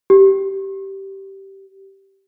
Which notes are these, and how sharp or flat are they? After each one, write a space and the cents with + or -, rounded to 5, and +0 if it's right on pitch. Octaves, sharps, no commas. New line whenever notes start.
G4 -15